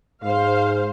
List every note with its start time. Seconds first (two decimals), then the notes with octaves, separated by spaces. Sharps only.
0.23 G#2 C5 F5